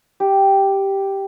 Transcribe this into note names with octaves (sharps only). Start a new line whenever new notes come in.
G4